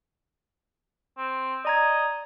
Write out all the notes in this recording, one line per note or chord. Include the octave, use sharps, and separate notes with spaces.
C4
D5 D#5 A#5 G#6